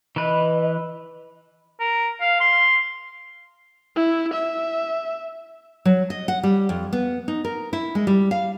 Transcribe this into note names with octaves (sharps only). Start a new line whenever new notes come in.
E3 B4 D#5
A#4
F5
C6
E4
E5
F#3
D#5
F#5
G3
F2
B3
D#4
A#4
E4
G#3
G3
F5